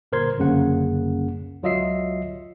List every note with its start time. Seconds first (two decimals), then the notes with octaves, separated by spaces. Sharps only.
0.12 G1 A#2 A#4 C5 C6 G#6
0.38 G1 C2 F#2 C#3 A#3 F#5
1.63 C#2 F#3 F4 D#5 E5 C7